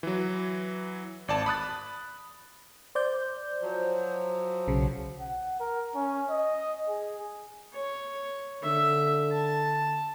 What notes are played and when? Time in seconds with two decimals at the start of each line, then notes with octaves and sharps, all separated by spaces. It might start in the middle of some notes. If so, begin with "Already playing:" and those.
0.03 E3 F#3
1.28 G#1 D5 A5
1.46 B5 D#6 F#6 A6
2.95 C5 D5 G6
3.62 F3 F#3
4.67 B1 C#3
5.20 F#5
5.60 A#4
5.95 C#4
6.30 D#5
6.88 G#4
7.74 C#5
8.63 D3 E5
9.32 A5